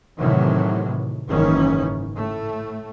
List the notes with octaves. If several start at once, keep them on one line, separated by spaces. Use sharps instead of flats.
A2 C3 D#3 E3 F#3
F#1 G#2 D#3 E3 C#4
A2 A3